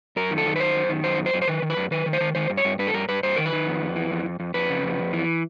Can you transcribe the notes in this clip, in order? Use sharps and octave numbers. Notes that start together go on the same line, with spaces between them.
F#2 A#4
D#3
A4
D#3
B4
F#2 C5
F#2
D#3
F#2 C5
F#2
C5
F#2
C5
D#3 B4
D#3
B4
F#2
D#3 B4
D#3
C5
D#3
D#3 C5
G2
C#5
G2
G2 B4
A4
G2 A#4
G2 B4
G2 C5
D#3 A#4
B4
D#3
F2
F2
E3
F2
F2
F2
F2 B4
C#3
F2
F2
E3